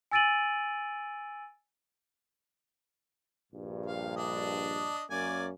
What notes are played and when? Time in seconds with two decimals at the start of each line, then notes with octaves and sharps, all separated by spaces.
0.11 G#5 E6 A6 D7 D#7 F#7
3.52 A#1 G2
3.86 F5
4.16 D4 D#5
5.10 F#2 A#3 C#4 D5 G#5